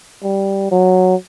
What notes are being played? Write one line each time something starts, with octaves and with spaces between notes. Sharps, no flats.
G3
F#3